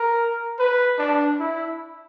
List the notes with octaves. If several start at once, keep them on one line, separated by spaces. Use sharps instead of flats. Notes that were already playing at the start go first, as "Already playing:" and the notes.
Already playing: A#4
B4
D4
E4